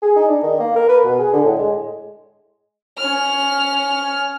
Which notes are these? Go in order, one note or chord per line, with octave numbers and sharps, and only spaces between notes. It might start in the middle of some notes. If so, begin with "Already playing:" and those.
G#4
D#4
D4
D#3
A#3
A#4
B4
B2
G#4
D3
A2
G#3
C#4 F6